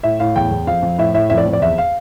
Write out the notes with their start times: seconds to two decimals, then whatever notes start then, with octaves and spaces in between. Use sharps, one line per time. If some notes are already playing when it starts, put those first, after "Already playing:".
0.03 A2 E5
0.20 A2 F5
0.36 E2 G5
0.51 E2
0.67 F2 F5
0.83 F2
0.98 A2 E5
1.14 A2 E5
1.30 F2 E5
1.38 D5
1.46 F2
1.53 D5
1.61 E2 E5
1.78 F5